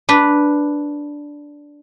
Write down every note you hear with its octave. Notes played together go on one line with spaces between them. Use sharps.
D4 B4